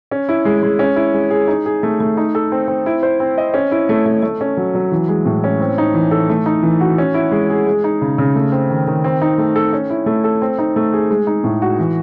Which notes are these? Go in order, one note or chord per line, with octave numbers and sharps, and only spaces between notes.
C#4
E4
G#3
G#3
C#4
E4
G#3
G#4
D#4
G#4
A3
A3
D#4
A4
C4
C4
E4
C5
C4
D#5
C#4
E4
A3
A3
A3
C#4
F#3
F#3
E3
G#3
A2
C#4
C4
D#4
E3
A4
A3
D#4
E3
F#4
C#4
E4
G#3
G#4
G#3
D#4
C#3
C#3
A3
C4
D#3
D#3
C4
D#4
A3
A4
C#4
E4
A3
A4
C4
D#4
A3
G#4
G#3
D#4
A2
F#4
E3